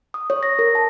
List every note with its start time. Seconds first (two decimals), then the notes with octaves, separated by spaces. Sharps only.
0.14 D#6
0.30 C#5
0.43 A#6
0.59 A#4
0.75 A5